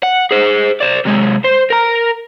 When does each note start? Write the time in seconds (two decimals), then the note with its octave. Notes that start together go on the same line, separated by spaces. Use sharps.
0.03 F#5
0.31 G#4 C5
0.80 C5 D5
1.05 C3 G#3
1.44 C5
1.70 A#4 A#5